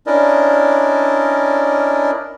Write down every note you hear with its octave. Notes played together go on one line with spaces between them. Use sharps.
C#4 D4 E4 A#4 D5 D#5